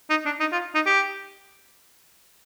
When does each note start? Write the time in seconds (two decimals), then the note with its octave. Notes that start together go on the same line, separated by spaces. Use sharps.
0.10 D#4
0.25 D4
0.40 D#4
0.52 F4
0.75 D#4
0.86 G4